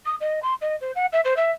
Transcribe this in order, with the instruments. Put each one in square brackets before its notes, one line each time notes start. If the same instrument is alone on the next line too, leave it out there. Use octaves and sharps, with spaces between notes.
[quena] D#6
D#5
C6
D#5
C5
F#5
E5
C5
E5